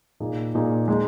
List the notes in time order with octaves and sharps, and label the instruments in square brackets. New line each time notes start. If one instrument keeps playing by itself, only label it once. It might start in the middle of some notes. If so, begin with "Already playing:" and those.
[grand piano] A#2 A#3 D#4 G#4
A#2 A#3 D#4 G#4
G#3 D#4 G#4